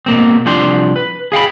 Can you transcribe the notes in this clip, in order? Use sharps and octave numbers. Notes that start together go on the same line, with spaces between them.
B2 A#3 C4
C2 F3 D4 G5 C6
B4
G#4 F5 G5 B5